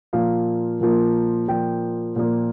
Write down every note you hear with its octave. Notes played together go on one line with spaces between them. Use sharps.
A#2 F3 A#3 F5
A#2 F3 A#3
A#2 F3 A#3 G5
A#2 F3 A#3